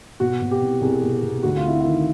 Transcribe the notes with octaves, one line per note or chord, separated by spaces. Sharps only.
B2 F#4
B2
G4
C2
C2 G#4
B2
B2
D2 F#4
F4
C3 E4
D#3 F4